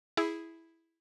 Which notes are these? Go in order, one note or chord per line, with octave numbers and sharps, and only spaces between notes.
E4 G#4